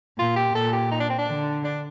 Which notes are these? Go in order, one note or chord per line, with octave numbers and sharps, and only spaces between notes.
A#2 F4
G4
A#2 A4
G4
D#4
D4
C4
D4
D3
D4